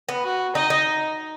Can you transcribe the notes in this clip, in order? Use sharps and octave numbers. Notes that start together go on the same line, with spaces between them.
B3
F#4
D#4 D#5
D#4